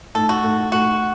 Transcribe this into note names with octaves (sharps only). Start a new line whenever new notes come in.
A2 A3 D#4 A4
F#4
A2 A3 D#4
A2 A3 D#4 F#4